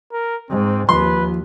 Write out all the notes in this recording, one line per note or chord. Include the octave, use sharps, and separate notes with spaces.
A#4
G#2 C4
D#2 F3 B4 C6